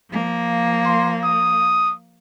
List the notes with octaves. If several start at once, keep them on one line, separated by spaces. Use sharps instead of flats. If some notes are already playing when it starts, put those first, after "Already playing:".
F3 A#3
C6
D#6